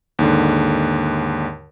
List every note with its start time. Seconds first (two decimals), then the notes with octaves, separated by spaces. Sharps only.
0.19 D#2 G#2 D3